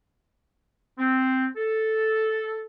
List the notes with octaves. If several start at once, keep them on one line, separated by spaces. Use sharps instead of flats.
C4
A4